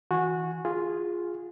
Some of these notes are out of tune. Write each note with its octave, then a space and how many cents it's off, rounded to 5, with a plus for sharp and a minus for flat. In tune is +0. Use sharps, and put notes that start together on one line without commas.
E3 -20 F#4 -20 G#5 +0
F4 +0 G#4 -15